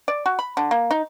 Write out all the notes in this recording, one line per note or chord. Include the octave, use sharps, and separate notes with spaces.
D5
F#4
B5
D3
A#3
D#4